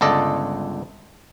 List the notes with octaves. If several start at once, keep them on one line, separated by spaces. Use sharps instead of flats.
G1 C#2 A4 D5 D#5